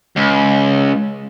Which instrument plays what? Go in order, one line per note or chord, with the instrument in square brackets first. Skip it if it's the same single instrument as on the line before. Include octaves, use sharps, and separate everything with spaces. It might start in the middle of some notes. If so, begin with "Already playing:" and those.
[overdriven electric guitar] C#2